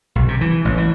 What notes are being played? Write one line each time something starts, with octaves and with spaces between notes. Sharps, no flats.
B1
C3
E3
A1
E3